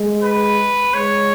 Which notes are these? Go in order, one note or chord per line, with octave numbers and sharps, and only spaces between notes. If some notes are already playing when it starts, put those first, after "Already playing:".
Already playing: G#3
B4
G#3 C#5